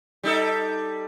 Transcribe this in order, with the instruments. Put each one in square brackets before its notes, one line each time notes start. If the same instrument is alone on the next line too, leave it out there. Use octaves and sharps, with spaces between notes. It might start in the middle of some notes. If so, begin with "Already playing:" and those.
[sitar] G3 D#4 A4